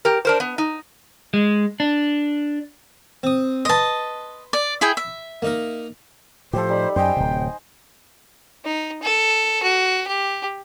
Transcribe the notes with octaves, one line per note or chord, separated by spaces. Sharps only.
G4 A#4
D4 A#4 C5
B3
D#4
G#3
D4
C4 D#6
B4 D#5 A5 C6
D5
E4 G#4 G5
E5
A#3 D#4 A#4
A2 F3 G4 A4 C5
G3 D#4 B5
F#2 C5 D#5 G5 G#5
D1 C3
D#4
A4
F#4
G4